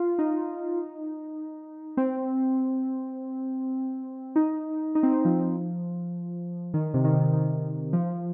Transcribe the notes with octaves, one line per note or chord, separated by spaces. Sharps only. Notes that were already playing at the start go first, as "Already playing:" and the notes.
Already playing: F4
D#4
C4
D#4
D#4
C4
D#4
F3
D#3
C3
D#3
C3
D#3
F3